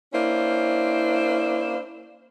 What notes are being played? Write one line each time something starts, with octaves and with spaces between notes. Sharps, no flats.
A#3 C#4 D4 E4 C5